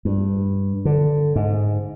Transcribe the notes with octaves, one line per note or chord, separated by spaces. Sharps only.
G2
D3
G#2